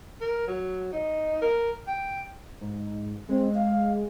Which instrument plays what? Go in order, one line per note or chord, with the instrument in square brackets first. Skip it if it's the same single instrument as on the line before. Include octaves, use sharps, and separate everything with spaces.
[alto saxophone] A#4
F#3
D#4
A#4
G5
[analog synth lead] G#2
[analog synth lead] G#3 [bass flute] C4
[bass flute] F5